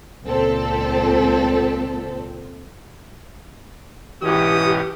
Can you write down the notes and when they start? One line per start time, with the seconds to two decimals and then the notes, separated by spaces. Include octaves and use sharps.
0.24 C#2 A#2 C4 A4
4.23 G#2 B2 E3 C#4 G4 D#6